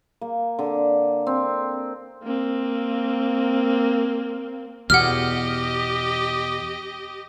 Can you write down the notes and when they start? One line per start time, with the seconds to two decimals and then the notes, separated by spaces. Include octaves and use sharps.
0.21 A#3
0.59 D3
1.27 C4
2.23 A#3 C4
4.90 E2 B2 G4 D#5 F#5 F6